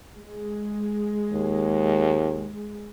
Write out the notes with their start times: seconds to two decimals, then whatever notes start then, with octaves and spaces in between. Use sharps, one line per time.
0.17 G#3
1.33 D#2